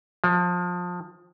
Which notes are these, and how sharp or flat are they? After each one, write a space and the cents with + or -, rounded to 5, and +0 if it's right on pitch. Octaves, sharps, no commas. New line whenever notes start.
F3 +25